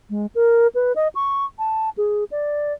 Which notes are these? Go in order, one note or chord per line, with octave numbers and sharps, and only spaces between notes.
G#3
A#4
B4
D#5
C#6
A5
G#4
D5